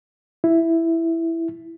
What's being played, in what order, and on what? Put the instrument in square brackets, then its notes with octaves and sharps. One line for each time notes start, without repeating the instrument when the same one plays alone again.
[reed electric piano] E4